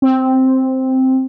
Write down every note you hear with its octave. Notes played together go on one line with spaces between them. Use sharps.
C4